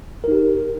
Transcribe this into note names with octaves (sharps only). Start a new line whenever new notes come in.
D#4 G4 A#4